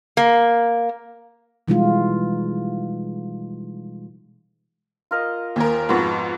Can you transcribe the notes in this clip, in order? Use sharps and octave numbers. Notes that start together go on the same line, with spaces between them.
A#3
B2 E3 G3 G#3 D#4 F4
F4 A#4 D#5
D#2 A#4 C5 G#5
F2 G#2 B3 F#4 A5